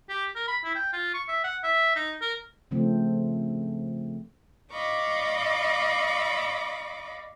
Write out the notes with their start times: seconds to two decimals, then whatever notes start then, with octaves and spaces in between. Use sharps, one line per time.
0.09 G4
0.36 A#4
0.48 B5
0.64 E4
0.75 G5
0.93 F4
1.14 C#6
1.28 E5
1.44 F#5
1.64 E5
1.96 D#4
2.21 A#4
2.71 C#3 F3 A3 C4
4.72 D5 D#5 F5 B5 C#6 D6